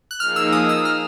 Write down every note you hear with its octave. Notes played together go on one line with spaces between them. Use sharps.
F#6
F3 A#3 D#4 G#4 F6
E6
D#6
E6
F6